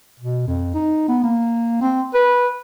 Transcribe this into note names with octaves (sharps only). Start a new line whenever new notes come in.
B2
F2
D#4
B3
A#3
C4
B4